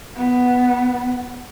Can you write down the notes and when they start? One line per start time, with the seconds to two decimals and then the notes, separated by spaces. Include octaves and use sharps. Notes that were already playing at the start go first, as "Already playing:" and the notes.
0.17 B3